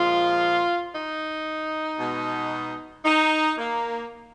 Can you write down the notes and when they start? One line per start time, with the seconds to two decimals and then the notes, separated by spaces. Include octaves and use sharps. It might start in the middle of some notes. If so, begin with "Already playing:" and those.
Already playing: A#2 F3 G#3 F4
0.93 D#4
1.99 B2 G#3
3.05 D#4
3.58 A#3